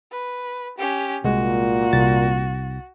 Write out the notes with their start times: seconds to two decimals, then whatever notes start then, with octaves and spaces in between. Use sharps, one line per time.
0.12 B4
0.78 C#4 G4
1.24 C2 A#2 G#3 F#4
1.92 C2 A6